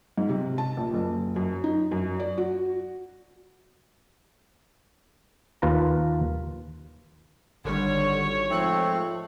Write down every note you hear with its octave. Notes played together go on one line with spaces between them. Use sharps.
G#2
C3
A5
A#1
F#1
F#2
D#4
F#2
D5
F#4
D#2 F4 B4 A5 A#5
G#1 D3 G3 C#5
G#2 F3 A3 C4 F#6